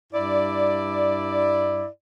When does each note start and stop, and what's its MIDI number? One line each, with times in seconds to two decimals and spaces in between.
0.12 1.85 43
0.12 1.85 64
0.12 1.85 74